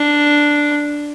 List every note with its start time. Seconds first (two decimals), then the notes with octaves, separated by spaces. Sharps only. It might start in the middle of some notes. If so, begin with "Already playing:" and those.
Already playing: D4